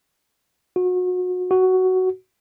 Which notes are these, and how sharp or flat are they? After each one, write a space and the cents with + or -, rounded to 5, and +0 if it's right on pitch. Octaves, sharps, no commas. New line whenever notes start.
F#4 -30
F#4 +10